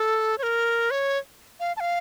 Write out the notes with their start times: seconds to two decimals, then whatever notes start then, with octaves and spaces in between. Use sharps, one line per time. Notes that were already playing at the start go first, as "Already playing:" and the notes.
Already playing: A4
0.38 C#5
0.43 A#4
0.91 C#5
1.60 F5
1.77 A5
1.80 F5